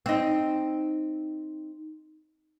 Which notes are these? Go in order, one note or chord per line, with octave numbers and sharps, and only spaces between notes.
C4 D#4